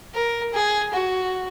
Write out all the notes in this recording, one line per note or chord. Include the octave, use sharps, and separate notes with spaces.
A#4
G#4
F#4